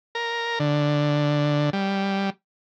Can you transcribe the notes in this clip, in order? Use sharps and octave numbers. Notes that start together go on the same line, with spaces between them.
A#4
D3
G3